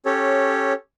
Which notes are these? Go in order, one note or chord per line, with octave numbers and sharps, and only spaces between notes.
C#4 G4 A4 C#5